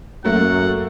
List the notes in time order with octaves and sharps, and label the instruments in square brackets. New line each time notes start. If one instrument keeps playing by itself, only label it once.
[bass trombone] F#2 [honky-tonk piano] F#3 A3 A#3 [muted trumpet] F#5